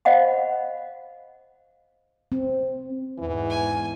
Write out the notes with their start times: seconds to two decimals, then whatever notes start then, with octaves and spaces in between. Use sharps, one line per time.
0.05 C5 D#5 F5 F#5 B5
2.32 C4
3.18 E2 G#2 E3
3.50 G#5